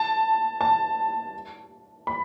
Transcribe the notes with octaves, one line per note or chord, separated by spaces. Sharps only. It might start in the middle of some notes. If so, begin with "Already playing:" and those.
Already playing: A5
A5
B5